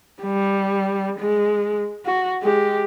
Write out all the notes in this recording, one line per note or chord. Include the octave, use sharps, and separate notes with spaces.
G3
G#3
F#4
G#3 G4